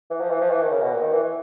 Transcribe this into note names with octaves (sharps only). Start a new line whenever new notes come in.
E3
F3
E3
F3
E3
D#3
C#3
B2
A#2
D#3
E3
E3